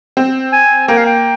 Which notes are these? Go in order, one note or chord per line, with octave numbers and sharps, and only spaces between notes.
C4
G#5
A#3 G5
F5
G5